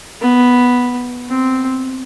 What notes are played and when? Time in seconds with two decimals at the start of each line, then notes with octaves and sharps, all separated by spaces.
0.21 B3
1.28 C4